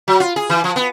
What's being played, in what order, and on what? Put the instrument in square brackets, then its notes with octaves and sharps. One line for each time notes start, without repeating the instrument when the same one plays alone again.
[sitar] F#3
F4
G#4
E3
F3
B3